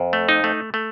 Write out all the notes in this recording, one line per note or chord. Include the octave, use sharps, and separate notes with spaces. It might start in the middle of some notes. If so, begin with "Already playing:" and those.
Already playing: F2
A3
D#4
A3
A3